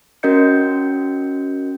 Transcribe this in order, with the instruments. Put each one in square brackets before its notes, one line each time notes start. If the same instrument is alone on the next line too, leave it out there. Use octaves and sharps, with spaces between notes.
[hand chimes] C#4 F#4 A#4 D#5 G6 C#7